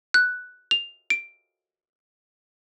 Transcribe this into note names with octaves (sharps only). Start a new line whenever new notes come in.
F#6
F7
D7